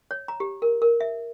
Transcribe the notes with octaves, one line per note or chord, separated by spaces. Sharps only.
C#5
A#5
G4
A#4
A#4
E5